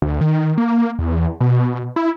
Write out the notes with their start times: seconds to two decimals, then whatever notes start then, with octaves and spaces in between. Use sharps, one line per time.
0.02 D2
0.21 D#3
0.58 A#3
0.99 E2
1.40 B2
1.96 E4